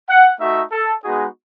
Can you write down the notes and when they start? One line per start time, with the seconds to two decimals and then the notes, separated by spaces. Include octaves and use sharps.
0.08 F#5
0.40 A3 D#4 F#4 E5
0.72 A4
1.04 G#3 B3 D#4 F#4 G#4